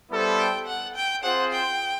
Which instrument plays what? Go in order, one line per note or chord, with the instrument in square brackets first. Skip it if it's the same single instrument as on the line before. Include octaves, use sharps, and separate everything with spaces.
[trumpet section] G3 B3 E4 A4 C5
[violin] G5
F#5
G5
[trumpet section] C4 F4 G#4 C5 [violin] F#5
[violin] G5